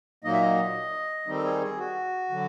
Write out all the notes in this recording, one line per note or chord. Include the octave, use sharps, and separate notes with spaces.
A#2 F#3 A#3 D#4 D#5
E5
D#5
D#3 G3 C4 D#4
A4
G#4
G#4
F#4
D3 F#3